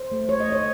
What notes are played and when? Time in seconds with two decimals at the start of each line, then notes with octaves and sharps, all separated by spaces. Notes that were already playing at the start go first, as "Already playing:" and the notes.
Already playing: C5
0.12 A3
0.29 A3 C#5
0.40 D#5
0.46 A3
0.52 C#5